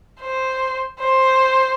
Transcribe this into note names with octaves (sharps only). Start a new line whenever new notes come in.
C5
C5